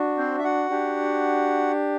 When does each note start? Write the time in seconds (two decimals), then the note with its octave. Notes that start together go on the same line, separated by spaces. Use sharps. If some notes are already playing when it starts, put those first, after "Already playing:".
Already playing: D4 F#4
0.18 C4 C5
0.39 E5
0.44 F#4 F#5
0.70 D4 G4